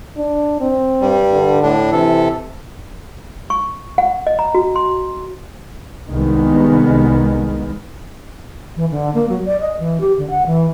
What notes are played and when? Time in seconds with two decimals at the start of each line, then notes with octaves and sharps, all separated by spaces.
0.17 D4
0.60 C4
1.01 G2 G3
1.33 D3
1.63 A2 D4
1.92 C3 E3 A4
3.50 C#6
3.98 F#5
4.27 D#5
4.39 A#5
4.55 F#4
4.76 C6
6.07 C2 D#3 G#3 B3
8.76 E3
8.91 D3
9.14 A#3
9.29 F#3
9.45 D5
9.60 D#5
9.79 E3
10.00 G4
10.17 D3
10.30 F#5
10.46 E3